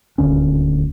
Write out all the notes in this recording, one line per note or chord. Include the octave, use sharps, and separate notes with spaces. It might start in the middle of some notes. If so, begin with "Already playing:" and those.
D#1 D2 C#4